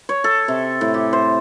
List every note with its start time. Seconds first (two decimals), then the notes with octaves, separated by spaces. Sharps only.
0.09 C#5
0.24 A4
0.48 C3
0.81 A2
0.94 G4
1.13 C5